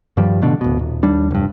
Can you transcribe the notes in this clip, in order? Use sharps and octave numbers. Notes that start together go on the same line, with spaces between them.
G2 D#3 F3 G3
A1 B2 D3
D1 B2
D#1
D#2 G3 D4
F1 G2